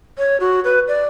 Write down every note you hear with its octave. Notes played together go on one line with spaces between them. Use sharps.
C#5
F#4
B4
D5